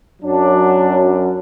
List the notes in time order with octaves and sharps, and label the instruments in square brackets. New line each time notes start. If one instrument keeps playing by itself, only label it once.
[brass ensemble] F#2 F#3 D4